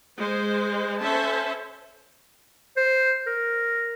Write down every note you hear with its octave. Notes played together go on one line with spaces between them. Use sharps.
G#3 C5
C#4 A4 C5 E5 A5
C5
A#4